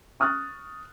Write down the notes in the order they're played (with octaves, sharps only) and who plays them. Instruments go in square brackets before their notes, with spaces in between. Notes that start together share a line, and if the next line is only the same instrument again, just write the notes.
[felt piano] C#6 D#6 F6 F#6 A6